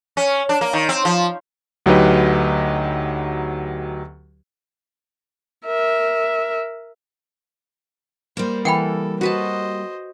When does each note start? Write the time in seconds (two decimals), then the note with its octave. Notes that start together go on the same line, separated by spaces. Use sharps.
0.17 C#4
0.49 D4
0.61 A#3
0.73 D#3
0.89 C4
1.05 F3
1.86 D2 F#3 D#4 G4 B4 D#5
5.66 A#4 E5
8.37 G3 A#3 C5
8.65 E3 A4 F#5 G5 B5
9.21 F#4 B4 C5 D#5 A5